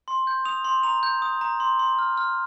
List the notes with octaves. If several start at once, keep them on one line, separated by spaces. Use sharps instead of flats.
C6
G6
D#6 F7
C6
A#5 F7
G6
D#6
A#5
C6
C6
F6
F6